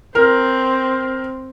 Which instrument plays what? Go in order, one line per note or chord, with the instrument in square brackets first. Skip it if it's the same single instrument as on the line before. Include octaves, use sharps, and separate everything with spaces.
[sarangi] C4 [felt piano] A#4